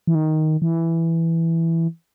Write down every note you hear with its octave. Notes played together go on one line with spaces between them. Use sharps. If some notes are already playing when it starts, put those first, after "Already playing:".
E3
D#3
E3